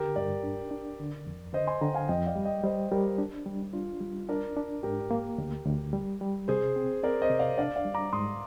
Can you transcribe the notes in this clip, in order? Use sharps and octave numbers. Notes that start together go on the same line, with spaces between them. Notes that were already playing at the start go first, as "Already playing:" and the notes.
Already playing: D3 G4 A#4
G2 A#4 D5
D4
D4
D3
F2
D3 C5 D#5
G#5 C6
D3 G5 A#5
F5 G#5
F2 D#5 G5
D5 F5
G3
D#5 G5
G3 C5 D#5
G3 G4 A#4
D4
G3
D4 F4
G3
D4 A#4 D5
D4
G#2 G4 A#4
A#3
D2
D2
G3
G3
C3 G#4 C5
C4
C4 A#4 D5
C5 D#5
C3
D5 F5
D4 D5 F5
D5 F5
G3
A#5 D6
G#2 C6 D#6